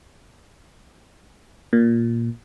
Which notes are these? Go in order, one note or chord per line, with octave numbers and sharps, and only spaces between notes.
A#2